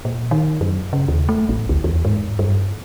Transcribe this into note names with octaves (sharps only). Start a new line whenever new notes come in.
A#2
D#3
F#2
C#3
D#2
A3
A1
D2
E2
G#2
G2